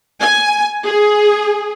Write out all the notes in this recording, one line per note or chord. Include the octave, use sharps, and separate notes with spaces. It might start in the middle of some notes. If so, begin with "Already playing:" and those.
G#5
G#4